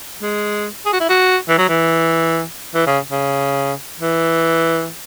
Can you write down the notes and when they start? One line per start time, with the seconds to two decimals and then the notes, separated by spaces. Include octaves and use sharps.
0.22 G#3
0.86 G#4
0.93 F#4
1.01 E4
1.09 F#4
1.49 E3
1.58 F#3
1.69 E3
2.75 E3
2.87 C#3
3.11 C#3
4.00 E3